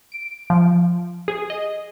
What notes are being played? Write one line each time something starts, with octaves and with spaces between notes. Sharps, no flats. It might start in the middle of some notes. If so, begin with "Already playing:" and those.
D7
F3
G#4
D#5